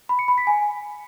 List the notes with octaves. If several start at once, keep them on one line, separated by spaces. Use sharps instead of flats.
B5
C#7
B5
B6
G#5